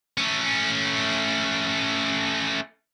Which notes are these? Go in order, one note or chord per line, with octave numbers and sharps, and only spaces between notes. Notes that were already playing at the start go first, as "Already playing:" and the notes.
A3 C#4